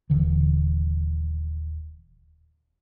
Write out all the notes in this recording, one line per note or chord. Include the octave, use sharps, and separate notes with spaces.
D#1 D3 E3